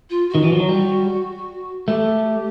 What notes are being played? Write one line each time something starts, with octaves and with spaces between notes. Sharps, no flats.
F4
F#4
D#3
E3
F3
F#3
G3
A3 G4